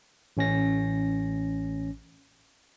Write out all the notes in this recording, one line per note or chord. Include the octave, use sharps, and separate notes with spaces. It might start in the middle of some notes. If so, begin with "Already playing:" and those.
A1 C#4 A#6